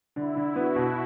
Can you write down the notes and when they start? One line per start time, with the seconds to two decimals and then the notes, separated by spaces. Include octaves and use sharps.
0.16 D3 E4
0.36 D3
0.56 B3 F#4
0.76 B2